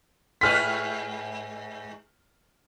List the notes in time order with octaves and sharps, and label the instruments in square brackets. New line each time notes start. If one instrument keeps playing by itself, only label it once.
[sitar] G#2 G#4 B4 [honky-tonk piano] F6 B6